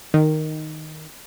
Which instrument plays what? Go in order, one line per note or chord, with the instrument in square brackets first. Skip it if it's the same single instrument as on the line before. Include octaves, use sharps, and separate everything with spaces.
[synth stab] D#3